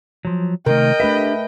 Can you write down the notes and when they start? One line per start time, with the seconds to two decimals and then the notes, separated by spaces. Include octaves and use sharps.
0.25 F3 F#3
0.66 C3 D#3 A3 A#4 D#5 G5
1.00 A3 D4 G4 B4 E5